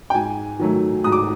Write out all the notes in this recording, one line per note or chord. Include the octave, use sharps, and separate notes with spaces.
G5
G#2 G#5
D#3 F#3 A3
G#2 D#6
D6